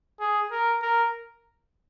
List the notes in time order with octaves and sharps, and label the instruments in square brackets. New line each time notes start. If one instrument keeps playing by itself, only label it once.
[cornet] G#4
A#4
A#4